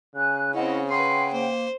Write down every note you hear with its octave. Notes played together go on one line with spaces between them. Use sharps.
C#3 G#5 F#6
C4 C#4 E4 D#5 F#5
G#4 B4 F#5 G5 C6
A#3 C5